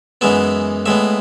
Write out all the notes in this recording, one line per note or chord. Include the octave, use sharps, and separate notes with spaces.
F#2 E3 G#3 B3 E5
A2 G#3 B3 E5